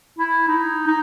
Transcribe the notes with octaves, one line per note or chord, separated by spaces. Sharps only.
E4
D#4
D#4